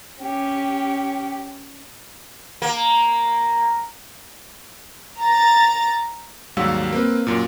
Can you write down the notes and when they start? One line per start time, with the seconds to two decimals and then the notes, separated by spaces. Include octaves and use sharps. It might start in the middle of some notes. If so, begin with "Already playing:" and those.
0.21 C#4 G4
2.62 A#3
5.20 A#5 A6
6.57 D#2 G#2 F#3 G3 F5 E6
6.93 A#3 C4 B4
7.27 F#2 A#2